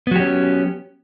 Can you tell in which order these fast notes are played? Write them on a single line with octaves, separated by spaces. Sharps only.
B3 F#3 G4 C#4